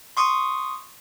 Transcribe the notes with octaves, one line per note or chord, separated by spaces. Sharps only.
C6 C#6 D#6